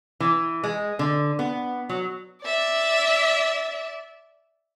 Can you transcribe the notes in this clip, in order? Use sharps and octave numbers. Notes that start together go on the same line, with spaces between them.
E3
G#3
D3
B3
F#3
D5 E5